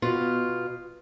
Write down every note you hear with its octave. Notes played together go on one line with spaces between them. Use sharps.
B2 F4